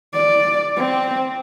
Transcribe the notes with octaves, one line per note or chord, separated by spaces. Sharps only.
D5
C4